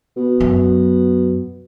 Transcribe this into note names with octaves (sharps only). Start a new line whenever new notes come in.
B2
F#2 F#3